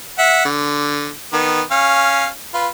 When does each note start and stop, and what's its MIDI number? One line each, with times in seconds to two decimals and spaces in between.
0.18 0.45 76
0.18 0.45 78
0.45 1.08 50
1.33 1.62 51
1.33 1.62 59
1.71 2.27 61
1.71 2.27 77
2.54 2.68 65
2.54 2.68 71